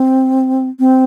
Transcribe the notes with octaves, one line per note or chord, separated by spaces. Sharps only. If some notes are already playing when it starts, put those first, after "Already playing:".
Already playing: C4
C4